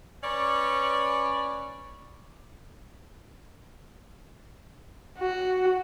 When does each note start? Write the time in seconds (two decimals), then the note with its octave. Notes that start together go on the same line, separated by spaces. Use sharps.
0.23 C#4 B4 C#5 D5
5.18 F#4